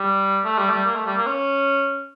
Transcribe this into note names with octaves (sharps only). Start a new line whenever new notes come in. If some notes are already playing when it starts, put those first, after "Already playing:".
Already playing: G3
A3
G3
A3
G3
A#3
A3
G3
A#3
C#4